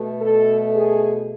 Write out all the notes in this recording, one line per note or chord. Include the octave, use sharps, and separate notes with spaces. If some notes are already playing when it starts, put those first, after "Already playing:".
Already playing: B2 A3
A4
G#4